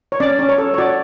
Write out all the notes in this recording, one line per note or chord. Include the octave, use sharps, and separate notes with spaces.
C#5
C#4 D5
C#4
C#5
A4
C#5
F#4 D5